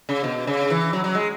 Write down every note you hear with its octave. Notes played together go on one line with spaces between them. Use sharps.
C#3
B2
C#3
E3
F#3
F#3
G#3